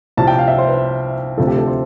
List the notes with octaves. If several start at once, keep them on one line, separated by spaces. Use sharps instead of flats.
C2 C3 F3 A5
G5
F5
E5
C5
B4
D2 C3 F3 A4
G4
A4
C5